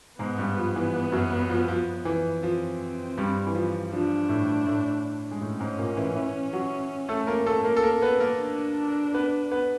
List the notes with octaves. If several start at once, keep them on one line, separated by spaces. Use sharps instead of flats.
G#2 G#3 B3
G2 G3
F3
E3
F#2 F#3
F3
F3
E3
F3 C4
G2 G3
E3
F3
F3 D4
A2 A3
A2 A3
G#3
A2 A3 C#4
G#2 G#3
A#2 A#3
E3 E4
E3 E4
F#3 F#4
A3 A4
A#3 A#4
A3 A4
A#3 A#4
A4
A#3 A#4
B3 B4
A#3 A#4
D4
B3 B4
B3 B4